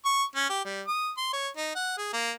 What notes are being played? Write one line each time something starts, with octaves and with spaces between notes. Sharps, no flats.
C#6
C#4
G4
G3
D#6
C6
C#5
D#4
F#5
G#4
A#3